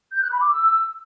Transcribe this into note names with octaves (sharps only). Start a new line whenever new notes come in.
G6
F#6
B5
D6
E6